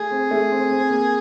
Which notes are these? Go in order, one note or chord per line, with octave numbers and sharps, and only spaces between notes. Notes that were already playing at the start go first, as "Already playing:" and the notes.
Already playing: A3 G#4
C4
A3
C4
C4
A#3